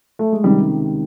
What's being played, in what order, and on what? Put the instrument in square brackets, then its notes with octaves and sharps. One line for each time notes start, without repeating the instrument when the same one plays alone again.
[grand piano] A3
G#3
C#2 C3 D#3 G3